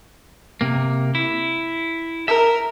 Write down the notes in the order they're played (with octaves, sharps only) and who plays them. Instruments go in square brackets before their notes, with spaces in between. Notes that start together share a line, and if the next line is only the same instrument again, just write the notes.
[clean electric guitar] C3 A#3
E4
[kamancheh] A#4 [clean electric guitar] E5